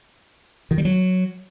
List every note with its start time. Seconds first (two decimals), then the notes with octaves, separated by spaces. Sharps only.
0.71 D#3
0.78 G3
0.85 F#3